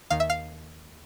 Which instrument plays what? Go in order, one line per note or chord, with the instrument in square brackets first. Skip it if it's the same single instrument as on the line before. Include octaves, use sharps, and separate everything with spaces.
[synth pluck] D#2 D#3 F5
E5
F5